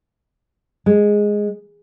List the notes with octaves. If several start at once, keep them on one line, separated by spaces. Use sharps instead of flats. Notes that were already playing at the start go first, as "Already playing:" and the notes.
G#3